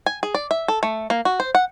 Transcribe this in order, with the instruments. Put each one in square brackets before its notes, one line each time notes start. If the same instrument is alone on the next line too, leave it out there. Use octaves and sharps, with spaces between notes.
[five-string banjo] G#5
G#4
D5
E5
A4
A3
A#3
F#4
C5
F#5